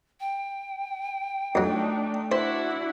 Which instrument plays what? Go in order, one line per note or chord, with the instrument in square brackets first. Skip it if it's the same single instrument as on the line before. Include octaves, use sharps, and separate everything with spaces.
[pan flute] G5
[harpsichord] F2 F#3 [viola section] A3 D4 D#4
[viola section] D4 F#4 F#5 [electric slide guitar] E4 [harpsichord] C5